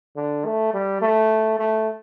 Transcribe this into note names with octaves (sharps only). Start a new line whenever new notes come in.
D3
A3
G3
A3
A3